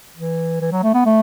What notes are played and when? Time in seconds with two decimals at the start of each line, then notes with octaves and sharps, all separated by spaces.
0.16 E3
0.61 E3
0.72 F#3
0.83 A3
0.94 B3
1.05 A3